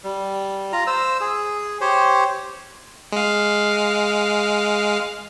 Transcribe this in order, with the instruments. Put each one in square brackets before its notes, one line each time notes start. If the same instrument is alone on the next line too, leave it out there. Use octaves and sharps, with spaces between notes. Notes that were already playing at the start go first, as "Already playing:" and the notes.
[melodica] G3
F4 A#5
C5 E6
G#4
G4 C5 C#5
[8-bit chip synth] G#3 F5